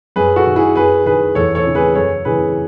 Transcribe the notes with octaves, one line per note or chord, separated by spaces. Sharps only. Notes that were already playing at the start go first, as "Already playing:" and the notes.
F#2 G#4 B4
F#4 A4
D#3
E4 G#4
F#2 G#4 B4
D#3 G#4 B4
E2 A4 C#5
A4 C#5
C#3 E3
G#4 B4
F#2 A4 C#5
C#3 E3 G#4 B4